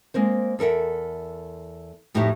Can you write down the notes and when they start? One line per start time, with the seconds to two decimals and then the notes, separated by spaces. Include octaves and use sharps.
0.14 G#3 A#3 C4 C5
0.59 E2 A4 A#4 E5 F#5
2.14 F2 A2 D#4 F#4 G4 E5